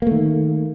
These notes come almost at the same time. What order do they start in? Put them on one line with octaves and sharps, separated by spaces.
A#3 A3 D#3